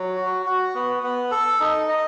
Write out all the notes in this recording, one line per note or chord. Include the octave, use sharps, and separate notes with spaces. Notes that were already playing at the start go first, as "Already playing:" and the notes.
Already playing: F#3
F#4
F#4
B3
B3
A4
D#4
D#5